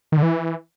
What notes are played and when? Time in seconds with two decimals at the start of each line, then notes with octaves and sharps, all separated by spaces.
0.12 D#3
0.17 D3
0.22 E3